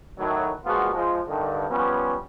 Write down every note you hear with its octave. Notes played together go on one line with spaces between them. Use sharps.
A2 D#3 F#3
A#2 F3 G#3 B3 F4 F#4
F3 G#3
G2 D3 D#3
F3 G3 B3 C#4